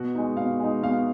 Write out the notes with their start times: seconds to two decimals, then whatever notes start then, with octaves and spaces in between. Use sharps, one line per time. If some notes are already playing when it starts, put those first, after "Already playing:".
Already playing: B2 F#4
0.15 G#3 D#4
0.37 B2 F5
0.60 G#3 D#4
0.83 B2 F5